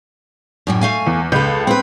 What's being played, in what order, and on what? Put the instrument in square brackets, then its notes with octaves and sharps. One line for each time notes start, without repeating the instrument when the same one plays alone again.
[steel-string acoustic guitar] F#2 A2 G3
A3 F5 G#5
[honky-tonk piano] E2
[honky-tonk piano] C#2 G6 [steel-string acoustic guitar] A4 B4
[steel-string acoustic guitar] C4 B4